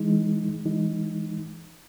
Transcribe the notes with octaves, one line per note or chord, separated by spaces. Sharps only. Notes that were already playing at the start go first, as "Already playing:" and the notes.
Already playing: E3 G#3 D#4
E3 G#3 D#4